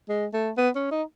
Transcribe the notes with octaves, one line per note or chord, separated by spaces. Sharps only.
G#3
A3
B3
C#4
D#4